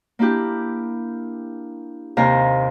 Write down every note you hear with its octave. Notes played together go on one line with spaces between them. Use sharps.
A#3 D4 E4 G4
D#2 C3 F5 A#5